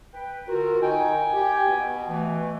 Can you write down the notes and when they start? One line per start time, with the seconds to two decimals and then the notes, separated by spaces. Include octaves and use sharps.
0.14 B4 G5
0.48 D3 F4 F#4 A#4
0.82 D#4 G5 G#5
1.33 G4
1.67 B2
2.08 E3 A3